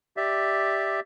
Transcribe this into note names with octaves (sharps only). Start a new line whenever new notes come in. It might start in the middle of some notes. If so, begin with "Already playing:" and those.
G4 D5 E5